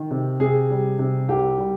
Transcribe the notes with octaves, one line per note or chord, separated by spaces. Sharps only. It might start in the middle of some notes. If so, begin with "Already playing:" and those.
Already playing: D#3
C3
C3 G#4
G3
C3
C2 G4
G3